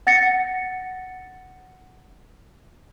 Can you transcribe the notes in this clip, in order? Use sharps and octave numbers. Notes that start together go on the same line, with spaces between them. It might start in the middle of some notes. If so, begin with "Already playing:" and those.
F#5 A6 A#6 C#7